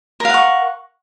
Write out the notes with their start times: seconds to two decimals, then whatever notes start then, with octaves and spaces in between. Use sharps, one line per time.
0.20 A#4
0.25 F5
0.29 F#5
0.34 C#6